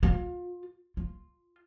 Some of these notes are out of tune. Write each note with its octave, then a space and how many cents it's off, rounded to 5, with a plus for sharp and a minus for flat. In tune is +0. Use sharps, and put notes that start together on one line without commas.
F4 +30
F4 +0